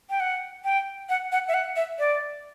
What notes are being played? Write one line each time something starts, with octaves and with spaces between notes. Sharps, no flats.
G5
F#5
G5
F#5
F#5
E5
F#5
E5
D5